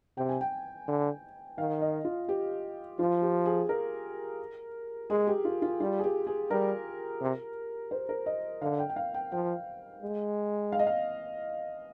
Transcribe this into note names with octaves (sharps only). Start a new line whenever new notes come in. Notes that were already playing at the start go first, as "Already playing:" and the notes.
C3 G5
G#5
G5
D3
D#3 F5
D#5
F4
G4
F3 F4
G4
G#4
A#4
G#3 G#4
G4
F4
F4
G3 F4
G#4
G4
G#4
G3 A#4
C3
C5
A#4
D#5
D3 F5
G5
G5
F5
G5
F3 G5
G#3
F5
D#5
F5